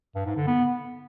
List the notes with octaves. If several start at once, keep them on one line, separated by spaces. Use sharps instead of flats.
G2
G#2
D3
B3